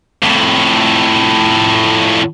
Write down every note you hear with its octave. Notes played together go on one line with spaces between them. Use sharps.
F2 A2